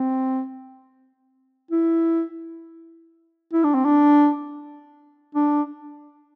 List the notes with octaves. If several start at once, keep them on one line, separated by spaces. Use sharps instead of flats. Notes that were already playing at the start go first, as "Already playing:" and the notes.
Already playing: C4
E4
E4
D4
C4
D4
D4